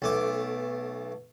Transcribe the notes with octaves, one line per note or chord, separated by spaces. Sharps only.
B1 A3 D6